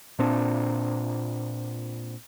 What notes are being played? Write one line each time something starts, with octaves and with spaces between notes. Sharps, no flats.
A#2 C4 D4